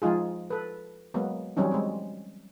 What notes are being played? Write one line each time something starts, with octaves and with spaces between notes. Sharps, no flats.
F3 G#3 D#4 F4 G#4
A4 B4
F#3 G#3 A#3 B3
E3 F#3 G3 C4 C#4 D#4
G#3 C4